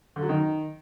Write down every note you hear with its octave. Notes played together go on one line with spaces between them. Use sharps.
D3
F#3
D#3